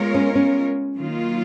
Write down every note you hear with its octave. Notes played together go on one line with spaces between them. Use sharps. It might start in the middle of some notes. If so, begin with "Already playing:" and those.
Already playing: G#3 B3 F4 A#4 C#5
C#4
C#4
D#3 F#3 A#3 F4